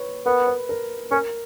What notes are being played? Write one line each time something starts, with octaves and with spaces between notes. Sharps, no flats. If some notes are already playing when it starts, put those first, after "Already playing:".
Already playing: B4 C#5
B3 A#4
B4
A#4
C#4 A#4